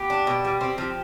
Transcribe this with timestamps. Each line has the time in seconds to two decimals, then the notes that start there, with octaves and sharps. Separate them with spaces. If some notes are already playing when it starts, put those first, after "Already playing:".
Already playing: B3 G4
0.10 D4
0.27 B2
0.45 G3
0.61 C4
0.78 F3